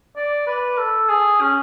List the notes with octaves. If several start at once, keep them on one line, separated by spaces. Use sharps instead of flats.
D5
B4
A4
G#4
C#4